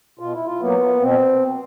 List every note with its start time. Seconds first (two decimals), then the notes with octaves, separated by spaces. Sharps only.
0.19 B2 F4
0.33 E4
0.46 F4
0.60 F#3 A#3 B3
1.01 B2 C4